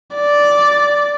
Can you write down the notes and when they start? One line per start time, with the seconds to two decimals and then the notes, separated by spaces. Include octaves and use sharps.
0.15 D5